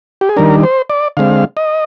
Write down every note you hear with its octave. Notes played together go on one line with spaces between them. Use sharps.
G4
G#4
D#3 G3 D4 A#4
C5
D5
D3 G#3 C4 F5
D#5